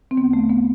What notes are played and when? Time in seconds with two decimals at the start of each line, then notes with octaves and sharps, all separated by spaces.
0.11 C4
0.17 E2 D3 B3
0.33 A3
0.49 B3